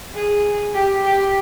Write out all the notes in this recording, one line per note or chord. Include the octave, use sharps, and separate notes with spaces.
G#4
G4
G4